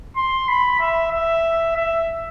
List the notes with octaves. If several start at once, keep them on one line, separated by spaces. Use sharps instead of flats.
C6
B5
E5
E5
E5